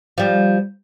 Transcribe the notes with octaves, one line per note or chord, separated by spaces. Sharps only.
F3 G3